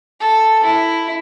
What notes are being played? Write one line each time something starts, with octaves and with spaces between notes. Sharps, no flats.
A4
E4